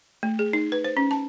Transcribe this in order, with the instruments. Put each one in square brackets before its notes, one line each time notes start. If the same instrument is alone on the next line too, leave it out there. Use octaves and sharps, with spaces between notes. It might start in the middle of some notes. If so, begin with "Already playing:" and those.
[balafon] A3
G#4
D#4
B4
C5
C#4
A5